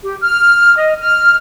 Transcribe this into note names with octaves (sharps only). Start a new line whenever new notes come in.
G4
F6
D#5
F6